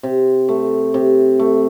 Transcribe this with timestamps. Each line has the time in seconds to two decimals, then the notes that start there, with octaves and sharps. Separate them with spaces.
0.03 C3
0.49 A3
0.94 C3
1.39 A3